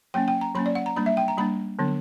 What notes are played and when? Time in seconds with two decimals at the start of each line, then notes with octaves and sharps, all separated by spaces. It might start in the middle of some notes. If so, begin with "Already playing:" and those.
0.14 F#3 A#3 C#4 G5
0.28 G5
0.41 A#5
0.55 F#3 A#3 C#4 B5
0.66 D5
0.75 F#5
0.86 A#5
0.96 G3 A#3 D4 B5
1.06 E5
1.17 G5
1.28 A#5
1.38 G3 A#3 D4 B5
1.79 D3 F#3 B3 D4